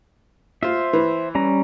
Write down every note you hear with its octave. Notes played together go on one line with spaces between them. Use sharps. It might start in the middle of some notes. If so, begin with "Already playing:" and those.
F4 C5 E5
E3
G3 C#4 A#5